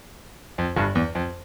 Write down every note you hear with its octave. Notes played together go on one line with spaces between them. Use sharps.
F2
G1 G2
E2
F2